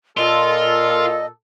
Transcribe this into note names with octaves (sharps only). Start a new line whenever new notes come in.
A#2 F4 A4 D#5